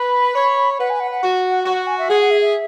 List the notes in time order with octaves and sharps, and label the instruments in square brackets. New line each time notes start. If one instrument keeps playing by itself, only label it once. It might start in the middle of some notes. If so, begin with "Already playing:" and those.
Already playing: [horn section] B4 [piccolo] B5
[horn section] C#5
[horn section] B4 [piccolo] F#5
[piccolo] G#5
F#5
F#5
[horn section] F#4
[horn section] F#4 [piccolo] F#5
[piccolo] F#5
G#5
E5
[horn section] G#4 [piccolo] F#5
[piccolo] F#5
E5
E5